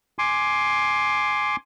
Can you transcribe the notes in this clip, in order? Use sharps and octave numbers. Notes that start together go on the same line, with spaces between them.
G#5 C6 D6